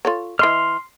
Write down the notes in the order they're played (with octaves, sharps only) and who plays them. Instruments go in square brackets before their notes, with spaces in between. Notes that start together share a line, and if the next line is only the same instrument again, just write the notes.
[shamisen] F4 A4 C#5
[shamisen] E3 D#5 [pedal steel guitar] C6 F6